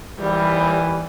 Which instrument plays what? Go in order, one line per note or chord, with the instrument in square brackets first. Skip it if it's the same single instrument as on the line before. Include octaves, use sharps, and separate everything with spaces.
[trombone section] D#2 E3 [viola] G3